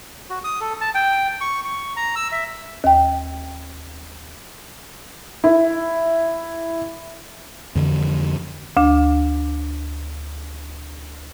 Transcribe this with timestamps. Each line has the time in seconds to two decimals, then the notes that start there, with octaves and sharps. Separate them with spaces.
0.30 F#4
0.44 D#6
0.61 A4
0.81 A5
0.94 G5
1.41 C#6
1.65 C#6
1.96 A#5
2.16 E6
2.32 E5
2.84 D#2 G5
5.44 E4
7.75 F2 D3 E3
8.77 D2 D4